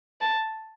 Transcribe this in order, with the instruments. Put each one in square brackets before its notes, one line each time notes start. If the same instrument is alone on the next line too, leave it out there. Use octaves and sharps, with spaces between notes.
[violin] A5